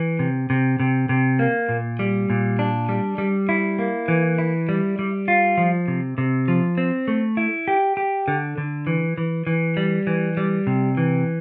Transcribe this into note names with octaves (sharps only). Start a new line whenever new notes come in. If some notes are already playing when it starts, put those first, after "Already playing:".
Already playing: E3
C3
C3
C3
C3
A#3
A#2
G3
A#2
D4
G3
G3
E4
A#3
E3
E4
G3
G3
F4
F3
C3
C3
F3
C4
A3
E4
G4
G4
D3
D3
E3
E3
E3
G3
E3
G3
C3
E3